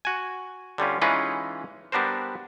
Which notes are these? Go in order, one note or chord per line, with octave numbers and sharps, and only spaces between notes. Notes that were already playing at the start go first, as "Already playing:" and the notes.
F#4 G#5
D3 G3 C#4 F4
E3 G#3 C#4 D#4 F4 B4
G3 B3 D4 A#4 C5